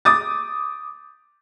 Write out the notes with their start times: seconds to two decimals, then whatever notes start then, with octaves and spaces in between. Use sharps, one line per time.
0.05 D6 D#6 A6